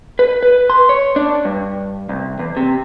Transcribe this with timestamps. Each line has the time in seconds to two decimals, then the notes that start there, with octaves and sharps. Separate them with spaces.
0.19 B4
0.43 B4
0.70 C6
0.89 C#5
1.16 D4
1.45 G2
2.09 C2
2.39 E2
2.57 C3